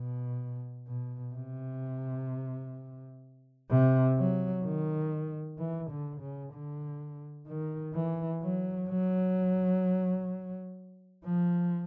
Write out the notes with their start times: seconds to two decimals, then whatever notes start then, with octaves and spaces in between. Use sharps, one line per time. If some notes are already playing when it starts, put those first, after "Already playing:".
Already playing: B2
0.88 B2
1.34 C3
3.70 C3
4.18 F#3
4.65 D#3
5.58 E3
5.91 D3
6.21 C#3
6.53 D3
7.47 D#3
7.94 E3
8.42 F#3
8.89 F#3
11.25 F3